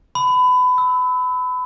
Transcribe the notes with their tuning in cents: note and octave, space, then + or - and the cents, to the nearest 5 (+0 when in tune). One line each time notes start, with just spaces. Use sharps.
B5 +25
E6 -30